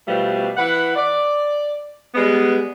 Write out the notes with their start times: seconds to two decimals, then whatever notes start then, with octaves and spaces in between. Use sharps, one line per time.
0.07 B2 F3 G3 A3 B3
0.57 E3 B4 F#5
0.96 D5
2.15 G3 G#3 B3